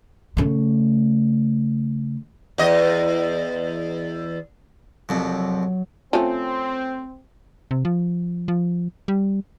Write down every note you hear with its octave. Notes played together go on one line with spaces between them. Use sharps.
C#3 A3
E2 D#5
C2 F2 C3 F#3
F3 A3 C4 C#4
C3
F3
F3
G3